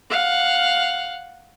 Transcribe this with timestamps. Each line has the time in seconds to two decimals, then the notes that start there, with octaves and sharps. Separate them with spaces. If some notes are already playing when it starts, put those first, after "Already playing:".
0.10 F5 F#5